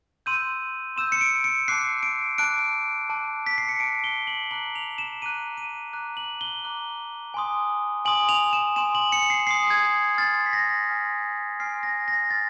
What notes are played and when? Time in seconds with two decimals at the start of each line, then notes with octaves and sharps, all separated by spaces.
0.26 C6 E6 G6 D#7
0.96 C6 E6 G6 E7
1.12 C#7
1.21 D7
1.44 C#7
1.68 A5 D6 F#6 C7
2.03 D7
2.38 A5 D6 F#6 D7
3.10 A5 D6 F#6
3.46 B6
3.58 C7
3.69 C#7
3.80 A5 D6 F#6 D7
4.04 G7
4.27 F#7
4.51 A#5 D6 F#6 F#7
4.75 F7
4.98 E7
5.22 A#5 D6 F#6 D#7
5.57 D#7
5.93 A#5 D6 F#6
6.17 F#7
6.41 G7
6.64 A#5 D6 F#6
7.34 G#5 C6 D#6
8.05 G#5 C6 D#6 F#7
8.29 F7
8.53 E7
8.76 G#5 C6 D#6 E7
8.95 F#7
9.12 C#7
9.30 C7
9.47 G#5 C6 D#6 C7
9.70 G#6
10.18 G#5 C6 F6 A6
10.46 B6
10.53 A#6
10.89 G#5 C6 F6
11.60 G#5 C6 F6 C7
11.83 A#6
12.08 A#6
12.30 G#5 C6 F6 A6